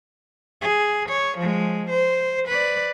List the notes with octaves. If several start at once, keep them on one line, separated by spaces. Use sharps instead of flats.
G#4
C#5
F3 G#3
C5
B4 D5